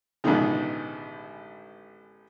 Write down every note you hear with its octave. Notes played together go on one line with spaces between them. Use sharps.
A1 G#2 B2 D3 D#3 F3